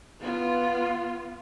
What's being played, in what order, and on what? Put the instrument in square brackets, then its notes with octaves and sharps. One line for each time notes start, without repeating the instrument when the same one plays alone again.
[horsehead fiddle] B3 F4